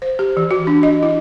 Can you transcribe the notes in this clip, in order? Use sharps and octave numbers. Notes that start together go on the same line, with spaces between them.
C5
G4
E3
F#4
D4
D#5
E4